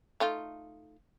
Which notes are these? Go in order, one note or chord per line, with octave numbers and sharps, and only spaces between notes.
A3 D#4 F4